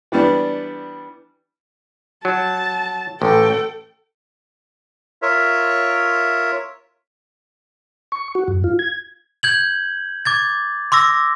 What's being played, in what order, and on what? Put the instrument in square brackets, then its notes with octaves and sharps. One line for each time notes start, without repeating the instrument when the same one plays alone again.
[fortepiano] E3 G3 B3 D4
[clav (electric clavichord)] F#3 [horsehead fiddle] A5
[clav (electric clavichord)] A1 [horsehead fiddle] A4 G5
[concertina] F4 A#4 C#5 E5
[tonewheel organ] C#6
F#4
F#2
F4
G#6
[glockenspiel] G6 G#6 F#7
D6 G#6 A6
C6 D6 E6 A#6